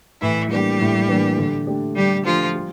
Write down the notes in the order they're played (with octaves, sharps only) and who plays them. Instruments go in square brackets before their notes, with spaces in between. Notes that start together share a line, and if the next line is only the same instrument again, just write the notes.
[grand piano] A2 [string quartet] E3 E4
[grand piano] E3 A#3 D4 [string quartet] G3 G4
[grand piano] A2
E3 A#3 D4
D3
A3 D4 G4
[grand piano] D3 [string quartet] G3 G4
[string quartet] F3 F4 [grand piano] A3 D4 G4
[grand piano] G3